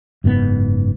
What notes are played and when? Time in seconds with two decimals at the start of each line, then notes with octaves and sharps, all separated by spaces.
0.24 F#1 G#2 C#3 B3